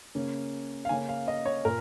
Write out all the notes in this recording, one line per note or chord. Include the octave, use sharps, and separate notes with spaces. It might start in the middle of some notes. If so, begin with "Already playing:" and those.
C#3 A#3 C#4
F5
C#3 A#3 C#4 G#5
F5
D#5
C#5
A#2 A#4